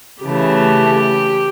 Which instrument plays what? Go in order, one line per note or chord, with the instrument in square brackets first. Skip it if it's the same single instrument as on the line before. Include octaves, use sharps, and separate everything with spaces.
[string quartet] C#3 E3 A3 G4